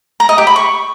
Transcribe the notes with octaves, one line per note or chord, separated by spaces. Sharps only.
A#5
D#5
G4
B5
C#6